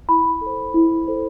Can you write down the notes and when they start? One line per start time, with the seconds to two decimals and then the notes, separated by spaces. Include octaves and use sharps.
0.09 E4 B5
0.41 A4
0.46 C5
0.74 E4
1.08 A4 C5